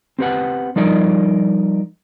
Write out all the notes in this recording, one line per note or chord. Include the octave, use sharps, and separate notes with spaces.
C4 G4 B4 F#5
F3 G3 D#4 A#4 D5 D#5